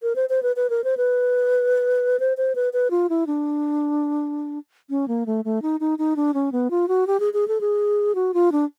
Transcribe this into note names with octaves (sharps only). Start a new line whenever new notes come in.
A#4
C5
C5
B4
B4
A#4
C5
B4
C5
C5
B4
B4
F4
E4
D4
C#4
A#3
A3
A3
D#4
D#4
D#4
D4
C#4
B3
F4
F#4
G4
G#4
G#4
A4
G#4
F#4
F4
D4